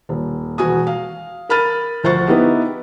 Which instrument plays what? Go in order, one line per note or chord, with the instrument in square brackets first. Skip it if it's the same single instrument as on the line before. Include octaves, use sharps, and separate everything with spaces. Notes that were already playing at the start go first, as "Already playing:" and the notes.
[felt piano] D#1
E1 F#4 G#5 D#6
F5
A#4 B5 F6 A6 D#7
D2 F3 C5 F#5 C#6 A6
B3 D#4 E4 G4